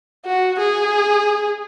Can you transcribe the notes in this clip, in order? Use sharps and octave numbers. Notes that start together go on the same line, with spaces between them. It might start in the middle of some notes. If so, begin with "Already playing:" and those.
F#4
G#4